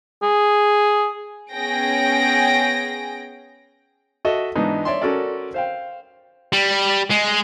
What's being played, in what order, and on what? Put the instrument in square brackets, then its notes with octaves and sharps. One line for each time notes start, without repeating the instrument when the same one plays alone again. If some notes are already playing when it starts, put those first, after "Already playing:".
[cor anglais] G#4
[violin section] B3 C#4 G#4 G5 A#6 D7
[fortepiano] F#4 A4 D#5 E5
G#2 E3 B3 D4 D#4
C#5 D5 E5 C6
C#4 F#4 A4 A#4 D5
C5 F5 G5
[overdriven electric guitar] G3
G#3